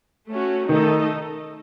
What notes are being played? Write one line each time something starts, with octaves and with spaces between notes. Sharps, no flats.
A3 C#4 F#4
D#3 A3 D#4 A4 D#5